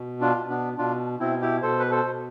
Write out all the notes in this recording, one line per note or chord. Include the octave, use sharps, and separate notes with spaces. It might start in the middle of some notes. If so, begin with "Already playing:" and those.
Already playing: B2
D4 F4
B2
B3 D4
B2 D4 F4
B2 C4 E4
E4 G4
B2 A4 C5
B4
A4 C5
B2